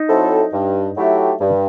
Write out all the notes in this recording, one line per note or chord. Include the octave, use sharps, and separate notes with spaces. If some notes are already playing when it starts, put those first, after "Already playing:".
Already playing: D#4
F#3 C4 E4 A4
G2
F#3 A3 E4 G4
G2